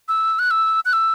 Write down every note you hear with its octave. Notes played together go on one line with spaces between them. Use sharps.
E6
F#6
E6
F#6
E6